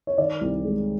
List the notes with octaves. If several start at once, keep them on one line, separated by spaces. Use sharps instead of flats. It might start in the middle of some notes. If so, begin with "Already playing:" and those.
C#5
D#3 D5
C2
G#3